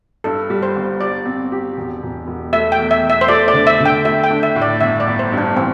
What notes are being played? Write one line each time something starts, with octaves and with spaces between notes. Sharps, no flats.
G2 A4
G3
C5
G1
G4 D5
C4
G4
E1
E1
E1
A3 E5
G5
E2
E5
E2
E5
C5
A3 D5
D5
D3
E5
D3
G5
A3 E5
G5
D4
E5
A2
D5
G1 E5
D5
G1
C5
G2
D4
E3 C4